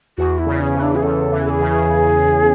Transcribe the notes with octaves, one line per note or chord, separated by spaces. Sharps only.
E2 F#4
E4
C#3
C#4
E3
D4
G#4
E2 A4
E3
A4
G#4
C#3